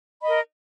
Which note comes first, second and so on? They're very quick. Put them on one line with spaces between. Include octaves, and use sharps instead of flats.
B5 D#5 A#4